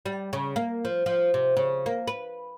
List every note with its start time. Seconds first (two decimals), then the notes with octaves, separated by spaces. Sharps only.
0.06 G3
0.33 C#3
0.56 A#3
0.85 F3
1.06 F3
1.34 C3
1.57 C#3
1.86 A#3
2.08 B4